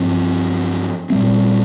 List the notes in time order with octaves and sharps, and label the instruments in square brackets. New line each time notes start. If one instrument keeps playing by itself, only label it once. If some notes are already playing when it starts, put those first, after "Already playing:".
Already playing: [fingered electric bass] G2 F3 C4
A#2 G3 C4